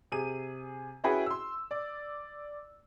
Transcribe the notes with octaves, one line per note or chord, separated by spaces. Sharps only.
C3 G#4 D#7
C#4 E4 F#4 G#4 B4 G5
C6 E6
D5